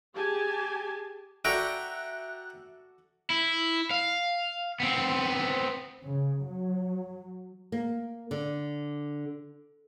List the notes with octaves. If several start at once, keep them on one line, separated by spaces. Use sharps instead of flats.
G4 G#4 G#5 A5
F#4 A4 D5 E5 G5 A#5 C#6 F#6
E4
F5
B3 C4
C#3
F#3
A#3
D3